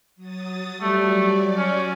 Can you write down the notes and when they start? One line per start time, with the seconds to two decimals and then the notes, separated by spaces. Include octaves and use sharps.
0.16 F#3 D#6 A6
0.81 F#3 G3 A3 D5
1.57 C#4